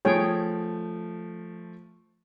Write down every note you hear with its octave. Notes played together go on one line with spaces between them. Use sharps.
F3 A3 G#4 C#5 G5